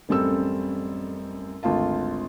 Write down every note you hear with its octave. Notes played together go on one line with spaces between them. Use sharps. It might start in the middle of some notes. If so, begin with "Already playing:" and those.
A1 F#2 G3 C4 A4 E6
G#1 D2 F4 F5 A5